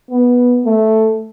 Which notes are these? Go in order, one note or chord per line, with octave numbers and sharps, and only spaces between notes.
B3
A3